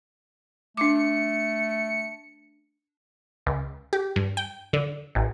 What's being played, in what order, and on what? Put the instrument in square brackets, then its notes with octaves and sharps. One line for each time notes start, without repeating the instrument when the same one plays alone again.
[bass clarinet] A3 [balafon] D4 D6 [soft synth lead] C#7
[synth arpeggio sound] C#2
G4
G2
G5
D3
A1